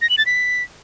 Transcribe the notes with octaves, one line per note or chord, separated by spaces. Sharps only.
A#6
F#7
A6
B6